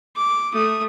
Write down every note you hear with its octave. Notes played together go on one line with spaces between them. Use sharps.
D6
A3 D#6